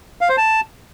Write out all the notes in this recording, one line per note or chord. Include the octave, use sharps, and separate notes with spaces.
F5
C5
A5